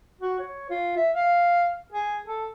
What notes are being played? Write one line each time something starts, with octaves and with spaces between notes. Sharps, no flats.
F#4
C#5
F4
E5
F5
G#4
A4